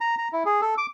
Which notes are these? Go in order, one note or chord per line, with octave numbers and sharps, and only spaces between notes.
A#5
A#5
E4
G#4
A4
D6